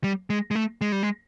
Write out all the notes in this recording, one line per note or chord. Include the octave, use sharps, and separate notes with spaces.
G3
G#3
G#3
A3
G#3
G3
G#3